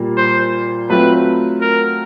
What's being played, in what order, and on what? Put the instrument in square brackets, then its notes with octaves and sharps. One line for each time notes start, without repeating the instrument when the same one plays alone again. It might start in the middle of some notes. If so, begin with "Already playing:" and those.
Already playing: [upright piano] A#2 G3 A#3
[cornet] C5
[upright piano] F#3 A3 C4 F4 [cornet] B4
[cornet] A#4